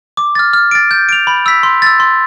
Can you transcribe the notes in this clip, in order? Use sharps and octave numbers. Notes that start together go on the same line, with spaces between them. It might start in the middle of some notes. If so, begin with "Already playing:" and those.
D6
F6 A6
F6
A6 D7
G6
D7 F7
B5
E6 B6
C6
E6 A6
C6